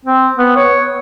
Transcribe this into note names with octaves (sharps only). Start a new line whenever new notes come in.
C4
B3
C#5